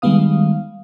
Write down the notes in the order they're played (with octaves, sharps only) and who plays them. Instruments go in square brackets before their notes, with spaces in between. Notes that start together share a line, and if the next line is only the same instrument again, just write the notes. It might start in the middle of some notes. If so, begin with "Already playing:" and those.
[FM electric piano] D#3 G3 G#3 B3 F5 D#6